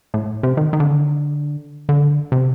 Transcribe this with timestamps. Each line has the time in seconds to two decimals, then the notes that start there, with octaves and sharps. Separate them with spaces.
0.14 A2
0.43 C3
0.57 D#3
0.73 D#3
0.80 D3
1.89 D3
2.32 C3